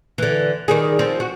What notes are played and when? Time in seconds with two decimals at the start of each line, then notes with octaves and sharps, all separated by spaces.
0.18 D3 E3
0.68 D#3 G3 G#4
0.99 F3 C4
1.20 F#4